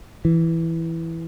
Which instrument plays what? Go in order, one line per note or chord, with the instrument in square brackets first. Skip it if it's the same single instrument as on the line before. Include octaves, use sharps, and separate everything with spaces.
[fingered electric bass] E3